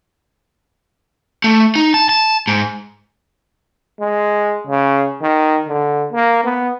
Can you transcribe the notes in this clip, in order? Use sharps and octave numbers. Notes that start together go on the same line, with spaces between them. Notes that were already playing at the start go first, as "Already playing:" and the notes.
A3
D#4
A5
A5
G#2
G#3
C#3
D#3
D3
A#3
B3